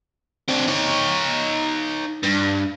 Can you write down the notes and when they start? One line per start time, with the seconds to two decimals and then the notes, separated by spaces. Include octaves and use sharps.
0.49 C4 D4
0.68 D#4 C#5
2.23 G2